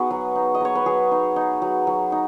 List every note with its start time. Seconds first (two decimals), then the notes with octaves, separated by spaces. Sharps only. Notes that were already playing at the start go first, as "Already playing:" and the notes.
Already playing: B3 D#4 F#4 G#4 B4
0.10 F#3
0.36 D#4
0.55 D#5
0.61 F#3 C#5
0.75 B4
0.86 F#3 G#4
1.11 D#4
1.36 D#4
1.62 F#3
1.87 F#3
2.12 D#4